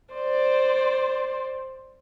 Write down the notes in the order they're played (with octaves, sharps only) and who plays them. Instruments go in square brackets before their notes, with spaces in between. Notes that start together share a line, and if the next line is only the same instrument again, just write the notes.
[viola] C5 D5